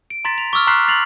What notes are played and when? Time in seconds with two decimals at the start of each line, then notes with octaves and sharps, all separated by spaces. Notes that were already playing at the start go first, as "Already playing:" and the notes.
0.10 D7
0.25 A#5 C6 A6 B6
0.38 F7
0.53 C#6 D6 E6 F6
0.67 A#5 C6 F6 F#6 B6 C7
0.88 A6 C7 F7 F#7